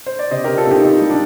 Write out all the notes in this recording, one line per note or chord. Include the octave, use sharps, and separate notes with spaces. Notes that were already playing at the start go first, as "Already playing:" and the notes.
C5
D5
C3 C5 D#5
C3 G4 A#4
F4 A4
C3 D#4 G4
C3 D#4
G3
D4